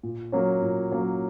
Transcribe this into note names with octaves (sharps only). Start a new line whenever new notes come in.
A#2
F#3 A#3 C#4
A#2
F#3 A#3 C#4